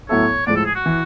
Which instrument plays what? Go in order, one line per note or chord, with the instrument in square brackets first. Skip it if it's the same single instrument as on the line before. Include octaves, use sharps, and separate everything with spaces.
[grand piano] A2 F#3 B3 E4 A4 [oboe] C#5
[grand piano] A2 F3 G#3 [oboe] D5
[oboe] A4
G#4
F#4
[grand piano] E3